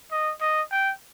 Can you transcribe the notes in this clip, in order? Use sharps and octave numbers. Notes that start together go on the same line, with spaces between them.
D#5
D#5
G5